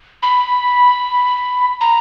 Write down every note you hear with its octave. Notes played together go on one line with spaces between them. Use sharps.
B5
A#5